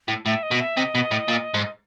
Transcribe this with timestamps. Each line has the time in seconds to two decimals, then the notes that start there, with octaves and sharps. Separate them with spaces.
0.08 A2
0.26 A2 E5
0.43 D#5
0.51 B2
0.60 E5
0.77 C3 D#5
0.95 B2
1.11 A2
1.28 A#2
1.54 G#2